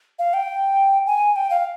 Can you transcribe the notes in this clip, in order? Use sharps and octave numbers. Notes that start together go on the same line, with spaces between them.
F5
G5
G#5
G5
F5